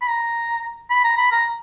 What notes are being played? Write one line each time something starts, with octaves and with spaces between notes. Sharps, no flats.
B5
A#5
B5
A#5
B5
A#5